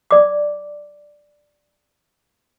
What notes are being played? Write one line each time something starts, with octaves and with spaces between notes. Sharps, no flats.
D5 D6